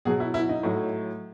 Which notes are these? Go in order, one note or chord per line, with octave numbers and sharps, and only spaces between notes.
B2 F#3 G#4
E4
E4
D#4
A2 F#3